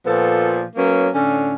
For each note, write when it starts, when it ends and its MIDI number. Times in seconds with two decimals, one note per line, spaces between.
0.05 0.63 46
0.05 0.63 53
0.05 0.63 59
0.05 0.63 69
0.76 1.08 54
0.76 1.08 58
0.76 1.08 59
0.76 1.08 61
1.14 1.55 45
1.14 1.55 50
1.14 1.55 61